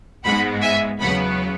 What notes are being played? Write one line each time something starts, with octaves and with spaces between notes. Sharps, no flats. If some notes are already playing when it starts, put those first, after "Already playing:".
G#2 G#3 B3 F#5 B5
E5 G#5
E2 C#3 F#3 B3 F#5 B5